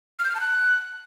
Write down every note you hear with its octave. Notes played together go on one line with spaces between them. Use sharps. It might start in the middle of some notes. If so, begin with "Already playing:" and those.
F6
G6
F6
A5
F#6